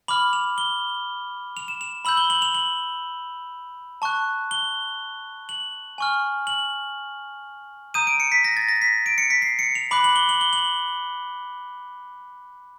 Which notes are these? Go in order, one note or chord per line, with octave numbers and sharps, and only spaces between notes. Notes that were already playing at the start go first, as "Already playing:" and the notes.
B5 D6 F6 F#7
F7
G7
F7
E7
F7
B5 E6 G6 F#7
G7
F#7
F7
F#7
A5 C#6 F#6
G7
F#7
G#5 C#6 F6
F#7
A#5 D#6 G6 D#7
D7
C#7
B6
A#6
A6
A#6
B6
D7
C#7
B6
C7
C#7
F7
B5 D6 F#6 F#7
F#7
G7
F#7
G7
F#7